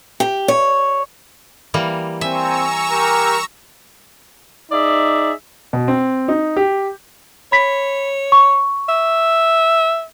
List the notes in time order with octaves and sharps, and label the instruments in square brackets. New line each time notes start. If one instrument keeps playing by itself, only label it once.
[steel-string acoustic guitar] G4
C#5
[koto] E3 G3 A#3
[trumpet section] C4 [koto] E5 [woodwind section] G#5 [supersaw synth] A#5 C#6 E6
[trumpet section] G4 A#4
[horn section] D#4 G#4 D5 E5
[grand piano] B2
C4
D#4
G4
[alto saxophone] C#5 [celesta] B5 B6
[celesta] C#6
[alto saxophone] E5